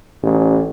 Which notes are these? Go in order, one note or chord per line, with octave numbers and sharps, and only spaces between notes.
A1